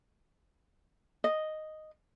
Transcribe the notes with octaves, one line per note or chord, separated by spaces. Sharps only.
D#5